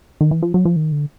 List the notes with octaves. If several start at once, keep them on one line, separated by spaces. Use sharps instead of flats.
D#3
E3
F3
F#3
F3
D#3
D3